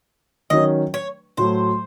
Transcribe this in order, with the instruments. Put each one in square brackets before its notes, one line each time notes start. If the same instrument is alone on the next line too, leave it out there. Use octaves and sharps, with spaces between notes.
[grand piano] D#3 F#3 C#4 [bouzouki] D#5
[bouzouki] C#5
[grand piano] A2 F#3 A3 [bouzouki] C5